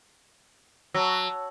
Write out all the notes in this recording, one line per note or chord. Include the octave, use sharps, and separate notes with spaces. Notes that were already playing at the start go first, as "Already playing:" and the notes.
F#3 A5 E6